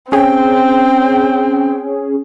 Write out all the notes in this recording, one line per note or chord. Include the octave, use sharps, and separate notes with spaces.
C4 C#4 G#4 G5